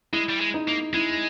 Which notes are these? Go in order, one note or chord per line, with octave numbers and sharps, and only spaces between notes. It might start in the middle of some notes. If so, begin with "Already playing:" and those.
G#3 E4
G3
G#3
D#4
A#3
G#3 E4